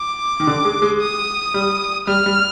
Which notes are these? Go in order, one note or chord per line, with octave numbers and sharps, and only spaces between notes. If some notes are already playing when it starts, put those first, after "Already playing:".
Already playing: D6
D#3
D3
G#3
G#3
D#6
G3
G3 F6
G3